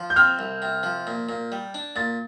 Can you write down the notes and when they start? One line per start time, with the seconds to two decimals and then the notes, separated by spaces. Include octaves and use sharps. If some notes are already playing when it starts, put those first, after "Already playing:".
Already playing: F3
0.10 G6
0.16 C4 F6
0.39 C2
0.62 C3
0.83 F3
1.07 A#2
1.29 A#2
1.52 G3
1.74 D4
1.96 A#2 A6